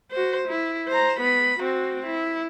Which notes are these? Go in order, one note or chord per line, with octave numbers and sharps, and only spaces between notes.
F#4 C5
E4
C5 A#5
B3 B5
C4 F#4
E4